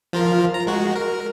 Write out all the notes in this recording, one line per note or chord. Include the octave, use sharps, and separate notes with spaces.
F3 F4 A#4
A#5
G#3 F#4
A#4